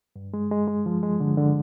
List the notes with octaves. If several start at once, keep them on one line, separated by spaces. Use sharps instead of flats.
G2
G#3
G#3
G#3
F3
G#3
D3
D3